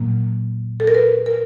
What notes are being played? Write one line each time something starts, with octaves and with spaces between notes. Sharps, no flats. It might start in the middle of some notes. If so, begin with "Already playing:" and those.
Already playing: A#2 F#3 A#3
A4
A#4
B4
A#4